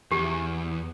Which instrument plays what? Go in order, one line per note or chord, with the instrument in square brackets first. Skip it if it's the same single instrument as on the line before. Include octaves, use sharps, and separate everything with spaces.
[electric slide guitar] E2 [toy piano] G4